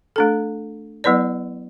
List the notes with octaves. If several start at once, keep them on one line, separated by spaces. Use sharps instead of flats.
A3 D4 A4
F#3 B3 E4 B4 D5